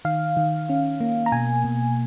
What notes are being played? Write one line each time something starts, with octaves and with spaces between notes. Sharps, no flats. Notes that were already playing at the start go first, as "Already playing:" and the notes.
D#3 F5
D#3
C#4
A#3
A#5
B2 G#5
B2